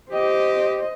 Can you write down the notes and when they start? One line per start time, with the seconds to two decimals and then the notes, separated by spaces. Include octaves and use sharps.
0.11 G4 C5 D#5